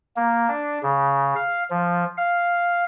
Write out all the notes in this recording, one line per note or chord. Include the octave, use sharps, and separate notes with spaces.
A#3
D4
C#3
F5
F3
F5